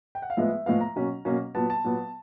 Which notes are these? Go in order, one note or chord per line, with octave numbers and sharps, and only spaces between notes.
G5
F#5
F5
A2 F3 G#3 B3 E5
A2 F3 G#3 B3 F5
A#5
B2 F#3 A#3 C#4
B2 F#3 A#3 C#4
A#2 F#3 B3 A5
A5
A#2 F#3 B3